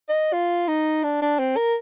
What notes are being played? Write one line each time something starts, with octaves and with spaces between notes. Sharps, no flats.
D#5
F4
D#4
D4
D4
C4
A#4